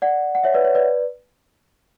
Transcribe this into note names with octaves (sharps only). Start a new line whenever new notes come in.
D5 F#5
F#5
C#5 E5
B4 D5
C#5
B4 D5